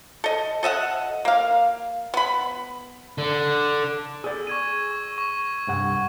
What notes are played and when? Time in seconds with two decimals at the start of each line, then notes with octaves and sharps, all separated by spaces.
0.24 A4 D#5
0.63 A4 D#5 E5 F#5
1.25 A#3 F5
2.14 B3 B5
3.18 D3
4.24 G#4 D5 E6
4.47 C#6 G#6 D#7
4.91 C#6
5.18 C#6
5.67 C2 G2 F#5